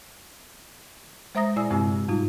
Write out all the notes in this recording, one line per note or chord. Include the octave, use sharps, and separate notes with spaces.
G#3 C5 E5 A#5 D#6 A#6
A#2 E4 D5 G#5 E6
G2 C3 G#3 C4 G4
G#2 G3 D#4 F4